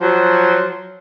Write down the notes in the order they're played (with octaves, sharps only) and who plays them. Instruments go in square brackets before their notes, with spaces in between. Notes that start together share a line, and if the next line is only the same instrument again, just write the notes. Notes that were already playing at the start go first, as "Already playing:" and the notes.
[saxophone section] F3 F#3